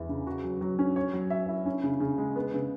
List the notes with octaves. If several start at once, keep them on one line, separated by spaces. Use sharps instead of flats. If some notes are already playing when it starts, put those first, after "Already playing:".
Already playing: E2 E4
C#3
F#4
F#3
F#3
C#4
C#5
F#3
E5
E4
C#4
C#3
C#3
G#3
B3
C#3